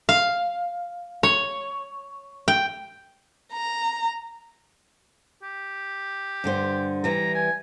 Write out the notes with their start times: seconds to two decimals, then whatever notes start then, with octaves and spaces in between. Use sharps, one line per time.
0.09 F5
1.23 C#5
2.48 G5
3.53 A#5
5.43 G4
6.44 G2 D3 C5
7.04 E3 G3 A#5
7.35 G#5